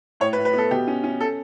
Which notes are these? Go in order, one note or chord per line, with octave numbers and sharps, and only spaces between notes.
A2 C#5
B4
A2
B4
B3 A4
B2 G4
C#4
C#4
A4